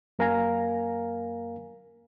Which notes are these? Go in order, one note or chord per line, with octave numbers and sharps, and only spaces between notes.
F#2 A#3 A#4 F5 G#5 A#5